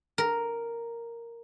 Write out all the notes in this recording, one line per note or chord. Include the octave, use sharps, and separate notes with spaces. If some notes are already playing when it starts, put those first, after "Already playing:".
A#4